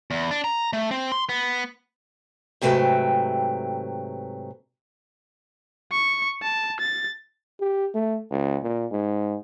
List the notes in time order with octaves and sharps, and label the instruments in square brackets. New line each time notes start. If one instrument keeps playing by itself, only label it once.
[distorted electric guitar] E2
D4
A#5
A3
C4
C6
B3
[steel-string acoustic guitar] G#2 C3 F#3 A3 B4 G5
[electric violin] C#6
A5
A6
[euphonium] G4
A3
C#2
A#2
G#2